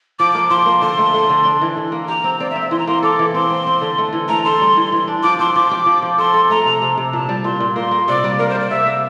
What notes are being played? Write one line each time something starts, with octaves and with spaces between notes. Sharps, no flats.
F3 D6
A#3
F3 C6
A#3
D3 C6
A3
A3
D3
D4
E3
E3
A#3
G4 A#5
C4
C4 D5
E5
C4
E5
E3 C6
A#5
A#3 C6
A4 D6
E3
C4 C6
C4
C4
D3
A3
E3
A3 A#5
A4 C6
G3
E3
E3
D4
F3 D6
C4 C6
F3 D6
G4
F3
F3
A4 C6
A4
A3 A#5
C3
C3
C3
A#2 A5
G3
A#2 C6
A#2
A#3 C6
A#3
C3 D5
G3
A#3 A#4
C5
G3
D5
C3 E5
A#3